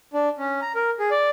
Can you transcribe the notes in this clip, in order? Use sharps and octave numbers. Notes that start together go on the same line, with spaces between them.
D4
C#4
A#5
A#4
G#4
D5